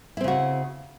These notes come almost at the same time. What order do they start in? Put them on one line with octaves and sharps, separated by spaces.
E4 C4 C#3 F#4